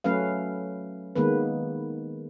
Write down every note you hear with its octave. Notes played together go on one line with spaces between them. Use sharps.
F#3 A3 C#4 B4 F5
D#3 G#3 A#3 B3 B4